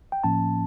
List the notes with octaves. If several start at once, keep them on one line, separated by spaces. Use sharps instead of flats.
G5
A2 F3 A#3 C#4 A5